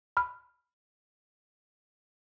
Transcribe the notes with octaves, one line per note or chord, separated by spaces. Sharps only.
B5 F6